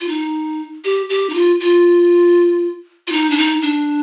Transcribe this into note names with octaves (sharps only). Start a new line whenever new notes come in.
F4
D#4
G4
G4
D#4
F4
F4
F4
D#4
D4
D#4
D4